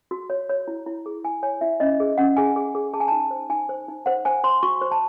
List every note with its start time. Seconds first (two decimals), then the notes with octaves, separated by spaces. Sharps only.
0.11 F#4
0.30 C#5
0.49 C#5
0.68 E4
0.86 E4
1.06 G#4
1.24 E4 G#5
1.43 C#5 G#5
1.61 E4 E5
1.80 C#4 D#5
2.00 G#4
2.18 C#4 F#5
2.37 G#4 G#5
2.56 G#4
2.75 G#4
2.93 G#4 A5
3.00 G#5
3.08 D#4 A5
3.31 C5
3.50 D#4 G#5
3.69 C5
3.88 D#4
4.06 C5 F#5
4.25 C5 G#5
4.44 C5 C6
4.63 F#4 C#6
4.81 C5
4.91 A5